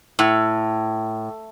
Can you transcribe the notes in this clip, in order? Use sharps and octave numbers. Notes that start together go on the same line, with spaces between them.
A2